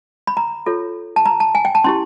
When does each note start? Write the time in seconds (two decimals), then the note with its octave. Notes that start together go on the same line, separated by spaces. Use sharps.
0.27 B5
0.37 A#5
0.66 F4 A4 C#5
1.16 A5
1.26 A#5
1.40 A5
1.55 G#5
1.65 G5
1.75 A5
1.84 C#4 E4 G4 C6